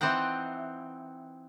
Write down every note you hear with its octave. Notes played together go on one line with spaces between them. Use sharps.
E3 C4 D#4 F#5 G5